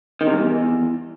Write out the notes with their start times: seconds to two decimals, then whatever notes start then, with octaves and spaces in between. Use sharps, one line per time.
0.21 D#3
0.27 C3
0.33 G#2
0.39 E2